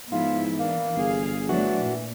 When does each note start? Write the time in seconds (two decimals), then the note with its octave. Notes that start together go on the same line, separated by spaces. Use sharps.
0.12 G#2 F3 B3 E4 F4
0.59 E3 A#3 D4
0.96 G1 G#4 F5
1.49 E3 F#3 A3 D4 F#4
1.82 A#2